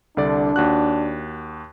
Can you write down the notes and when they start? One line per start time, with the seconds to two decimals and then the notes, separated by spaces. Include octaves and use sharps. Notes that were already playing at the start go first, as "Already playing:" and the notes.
0.17 C2 D3 D4 D5
0.56 D#2 F#4 F#6